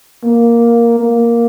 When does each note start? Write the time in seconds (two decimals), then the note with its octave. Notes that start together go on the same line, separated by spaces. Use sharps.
0.23 A#3
1.00 A#3